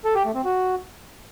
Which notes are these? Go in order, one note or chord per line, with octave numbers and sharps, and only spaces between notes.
A4
G4
A3
C4
F#4